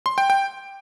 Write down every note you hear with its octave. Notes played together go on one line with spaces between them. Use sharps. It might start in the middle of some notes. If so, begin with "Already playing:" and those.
C6
G5
G5